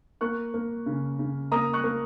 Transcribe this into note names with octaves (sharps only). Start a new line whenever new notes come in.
A#3 C#6 F#6
A#3
C#3
C#3
A#3 A#5 D#6
C#6 F#6
A#3